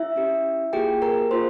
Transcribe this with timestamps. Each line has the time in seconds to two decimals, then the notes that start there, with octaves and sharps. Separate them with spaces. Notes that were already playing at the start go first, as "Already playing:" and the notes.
Already playing: E4 E5
0.16 C#4 G4
0.73 A#3 F4 G4 G#4 G5
1.02 A#4 A#5
1.31 A#3 F4 G#4 C5 C6